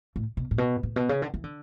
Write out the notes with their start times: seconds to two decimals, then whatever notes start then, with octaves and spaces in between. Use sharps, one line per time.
0.16 A2
0.37 B2
0.51 A2
0.58 B2
0.83 A2
0.96 B2
1.09 C#3
1.22 D3
1.34 E3
1.44 D3